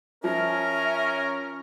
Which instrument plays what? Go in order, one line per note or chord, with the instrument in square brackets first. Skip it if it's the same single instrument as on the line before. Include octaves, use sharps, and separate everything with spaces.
[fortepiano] F3 [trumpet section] C#4 [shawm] A#4 [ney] E5